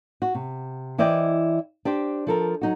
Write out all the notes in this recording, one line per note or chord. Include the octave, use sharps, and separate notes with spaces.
F#4
C3
E3 E4 C5 D5 D#5 G5
D4 G4 C5
F3 A4 A#4
F#3 D#4 F#4